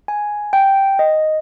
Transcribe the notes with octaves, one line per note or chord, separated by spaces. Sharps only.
G#5
G5
D#5